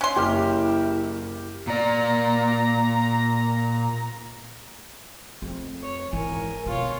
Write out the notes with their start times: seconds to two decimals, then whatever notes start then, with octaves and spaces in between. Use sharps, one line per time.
0.01 C#4 C6 F#6
0.16 F#1 E4 G4 F6
1.67 A#2 D5 A#5
5.42 F2 A3
5.82 C#5
6.13 G#1 E3 A#4 G#5
6.66 F2 B2 F4 C#5